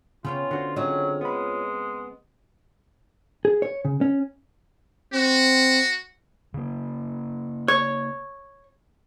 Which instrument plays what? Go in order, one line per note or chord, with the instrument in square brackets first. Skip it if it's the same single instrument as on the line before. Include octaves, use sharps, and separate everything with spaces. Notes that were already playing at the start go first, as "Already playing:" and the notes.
[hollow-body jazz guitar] C#3 [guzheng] B3 C#4 G5 [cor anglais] F4
[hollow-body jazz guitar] D3 F#4 C5
[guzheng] C#3 C4 [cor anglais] F#3 [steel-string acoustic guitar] F4 C#5 D#5
[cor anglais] G#3 [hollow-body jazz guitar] B3 B5
[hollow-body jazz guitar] G#4
C#5
C#3
C#4
[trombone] C4 [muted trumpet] F#4
[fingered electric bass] C#3 A#3
[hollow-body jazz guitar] C#5